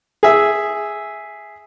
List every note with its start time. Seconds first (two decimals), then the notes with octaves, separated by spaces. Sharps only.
0.23 G#4 E5